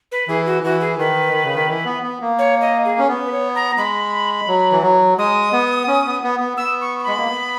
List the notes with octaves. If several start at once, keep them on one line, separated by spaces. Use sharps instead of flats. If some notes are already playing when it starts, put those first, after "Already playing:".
B4
E3 G#4
F#4
E3 F#4
G#4
D#3 B4
D#3
C#3
D#3
E3
B3
B3
A#3
C#5
D#5
G#4
C#4
B3
B4
C#5
A#5
G#3 B5
F#3
E3
F#3
G#3 D#6
B3
C#4
B3
B3
B3
B3 E6
C#6
C#6
G#3 B5
A#3
B3